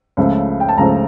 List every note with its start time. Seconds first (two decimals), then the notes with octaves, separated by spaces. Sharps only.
0.17 C#2 C#3 F3 A3
0.60 G5
0.69 A5
0.77 C#2 C#3 F3 A3 A#5